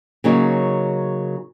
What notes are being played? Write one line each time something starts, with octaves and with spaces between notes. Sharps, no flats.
C#3 F#3 A#3 D#4